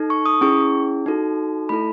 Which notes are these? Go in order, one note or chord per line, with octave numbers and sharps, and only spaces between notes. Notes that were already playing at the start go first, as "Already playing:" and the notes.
Already playing: D#4 A4
C#6
D#6
C#4 E4 G#4 C#6
D#4 F#4 A4
A3 E4 A4 B5